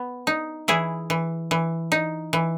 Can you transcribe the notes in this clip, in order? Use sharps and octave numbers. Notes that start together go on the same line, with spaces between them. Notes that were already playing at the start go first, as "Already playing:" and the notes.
Already playing: B3
D#4
E3 E4 G#4
E3
E3
D#4
E3